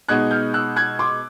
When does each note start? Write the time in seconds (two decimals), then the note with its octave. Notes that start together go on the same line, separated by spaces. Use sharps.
0.08 B2 G#3 B3 D#4 F#6 G#6
0.31 F6 G6
0.54 E6 F#6
0.76 F#6 G#6
0.99 C6 D6